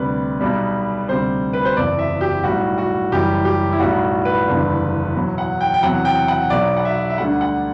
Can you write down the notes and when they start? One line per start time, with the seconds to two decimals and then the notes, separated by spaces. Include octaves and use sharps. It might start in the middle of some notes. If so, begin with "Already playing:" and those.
Already playing: D2 C3 G3 B4
0.41 B1 B2 G3
1.08 D2 C3 G3 C5
1.53 B4
1.65 C5
1.76 F#1 E2 C3 D5
1.99 E5
2.21 G4
2.44 B1 A2 G3 F#4
2.78 F#4
3.11 F#1 F#2 E3 G3 G4
3.45 G4
3.73 E4
3.79 B1 A2 G3 F#4
4.25 B4
4.47 F#1 E2 D3 G3
5.15 E2 B2 F#3
5.38 F#5
5.61 G5
5.74 G5
5.83 E2 C3 F#3 F#5
6.05 G5
6.28 F#5
6.50 B1 B2 F#3 D5
6.77 F#5
6.85 E5
7.10 E5
7.18 D2 D3 G3 F#5
7.41 F#5